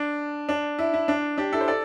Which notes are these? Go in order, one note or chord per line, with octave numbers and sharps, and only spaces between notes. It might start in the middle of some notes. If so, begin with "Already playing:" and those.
Already playing: D4
D4
E4
E4
D4
D4 G4
E4 A4
C5
A4 D5